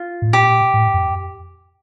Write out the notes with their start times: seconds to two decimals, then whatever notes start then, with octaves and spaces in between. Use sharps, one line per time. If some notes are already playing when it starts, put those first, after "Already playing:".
Already playing: F4
0.22 A2
0.33 A#2 G4
0.74 A2
0.94 F2